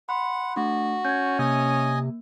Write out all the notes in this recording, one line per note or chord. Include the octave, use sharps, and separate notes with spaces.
F#5 B5 C6
A3 D4 F#4
C#4 G6 G#6
C3 A#3 D#5 G#5